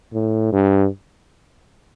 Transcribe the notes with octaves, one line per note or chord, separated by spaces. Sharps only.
A2
G2